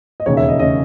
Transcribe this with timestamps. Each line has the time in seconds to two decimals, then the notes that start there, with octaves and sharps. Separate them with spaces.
0.20 D#5
0.26 E1 D#2 C#3 C#5
0.37 E5
0.48 D#5
0.59 E1 C#3 D#5